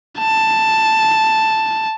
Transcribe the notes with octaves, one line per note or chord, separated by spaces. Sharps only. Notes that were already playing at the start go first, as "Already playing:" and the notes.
A5